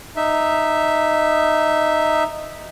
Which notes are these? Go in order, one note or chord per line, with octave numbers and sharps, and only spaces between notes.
D#4 E5